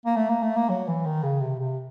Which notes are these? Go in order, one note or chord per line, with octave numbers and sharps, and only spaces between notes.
A#3
A3
A#3
A3
A#3
F#3
E3
D#3
C#3
C3
C3